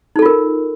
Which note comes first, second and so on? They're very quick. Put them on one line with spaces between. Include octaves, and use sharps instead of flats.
D#4 A4 F4 A#4